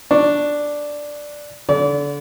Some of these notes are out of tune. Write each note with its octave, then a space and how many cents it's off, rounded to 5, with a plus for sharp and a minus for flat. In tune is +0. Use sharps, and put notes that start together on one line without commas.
D4 +0 C#6 +0
D3 -30 D5 -35